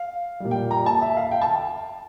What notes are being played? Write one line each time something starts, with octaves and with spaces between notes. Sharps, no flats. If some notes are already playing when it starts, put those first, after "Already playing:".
Already playing: F5
A#2 G3
G5
A#5
A5
E5
F5
G5
A5